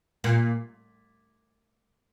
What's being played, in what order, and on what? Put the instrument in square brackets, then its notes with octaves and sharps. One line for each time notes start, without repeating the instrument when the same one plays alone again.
[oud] A#2